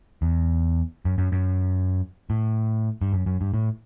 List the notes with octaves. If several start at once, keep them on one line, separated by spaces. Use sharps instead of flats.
E2
F#2
F#2
F#2
A2
G2
F#2
F#2
G2
A2